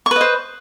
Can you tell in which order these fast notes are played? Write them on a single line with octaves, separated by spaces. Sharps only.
C#6 B4 D#5 C5